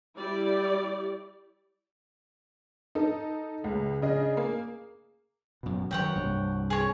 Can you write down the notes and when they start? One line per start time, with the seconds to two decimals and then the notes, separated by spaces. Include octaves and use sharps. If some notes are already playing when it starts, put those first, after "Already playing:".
0.17 G3 E4 G4 D5
2.95 D#4 A4
3.64 C#2 C#3
4.02 C#3 D4 G#4 D#5
4.37 A#3
5.63 F#2 B2
5.91 D#3 F#3 C#5 F#5 G5
6.16 C2 G2
6.70 G#4 C#5